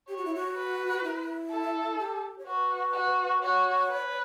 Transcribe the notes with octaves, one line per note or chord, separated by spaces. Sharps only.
G4 C#5
F#4
E4
F#4
B4
E4
A4
G4
C#5
F#4 B4
F#4
F#4 C#5
B4